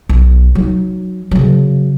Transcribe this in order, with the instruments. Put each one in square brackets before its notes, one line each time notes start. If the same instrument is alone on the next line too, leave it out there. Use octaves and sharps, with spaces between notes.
[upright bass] B1
F#3 D#4
C#3 F#3